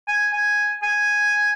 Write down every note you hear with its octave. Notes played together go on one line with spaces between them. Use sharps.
G#5
G#5
G#5